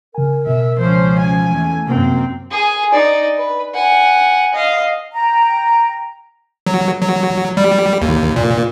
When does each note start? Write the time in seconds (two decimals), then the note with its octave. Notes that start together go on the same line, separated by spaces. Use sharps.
0.14 C#3 A#4 G#5
0.47 B2 E5
0.79 C#2 F3 C#4 C5
1.19 C#4 G#5
1.50 E2 A3
1.87 F#2 C3 F#3 A#3 C4
2.51 G#4 G#5
2.92 D#4 D5
3.38 B4
3.74 F#5 G#5
4.54 D#5 F5
5.13 G5 A#5
6.66 F#3
7.01 F#3
7.57 G3
8.02 D#2
8.36 A#2